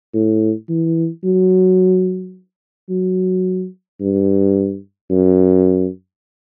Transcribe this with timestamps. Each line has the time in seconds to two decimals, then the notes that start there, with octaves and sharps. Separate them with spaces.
0.14 A2
0.69 E3
1.24 F#3
2.89 F#3
4.00 G2
5.10 F#2